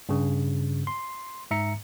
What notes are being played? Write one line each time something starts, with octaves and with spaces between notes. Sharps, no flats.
G2 C#3
C6
G#2 E5 A#5 C#7